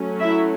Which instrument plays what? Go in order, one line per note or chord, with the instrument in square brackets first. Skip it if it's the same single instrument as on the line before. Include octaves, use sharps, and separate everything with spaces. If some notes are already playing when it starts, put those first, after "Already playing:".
Already playing: [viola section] F#3 A3 C#4
E4 E5